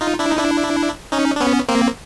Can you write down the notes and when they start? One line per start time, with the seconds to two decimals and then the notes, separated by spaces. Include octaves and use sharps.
0.01 D#4 F4
0.19 D4 E4
0.30 D#4
0.38 D4 E4
1.12 C#4 D#4
1.36 D4
1.40 B3 C#4
1.69 A#3 C4